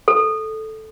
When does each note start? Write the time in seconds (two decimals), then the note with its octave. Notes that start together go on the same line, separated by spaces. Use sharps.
0.08 A4